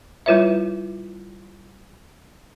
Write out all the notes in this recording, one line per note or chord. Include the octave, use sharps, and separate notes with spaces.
G3 E4 F4 B4 C#5 E5